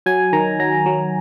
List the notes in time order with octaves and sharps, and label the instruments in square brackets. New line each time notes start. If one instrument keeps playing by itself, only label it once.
[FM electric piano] F#3 G#5
D#3 A#5
F#3 A#5
F#3